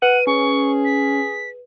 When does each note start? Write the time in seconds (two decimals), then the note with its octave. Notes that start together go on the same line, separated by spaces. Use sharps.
0.02 B4 F#5 D#7
0.27 C#4 G#4 C#6
0.85 B6